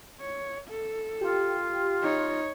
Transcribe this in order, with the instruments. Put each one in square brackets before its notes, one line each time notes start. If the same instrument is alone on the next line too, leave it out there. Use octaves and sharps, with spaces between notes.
[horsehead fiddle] C#5
A4
[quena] F4 [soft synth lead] G4
[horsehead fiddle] D#4 C#5